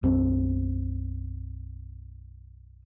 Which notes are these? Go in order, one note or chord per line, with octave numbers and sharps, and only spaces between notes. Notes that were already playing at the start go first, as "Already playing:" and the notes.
B1 F#2 C4